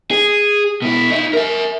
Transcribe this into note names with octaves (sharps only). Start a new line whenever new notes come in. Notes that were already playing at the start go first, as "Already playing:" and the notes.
G#4
B2 E4
D#4 E5
A#4 E5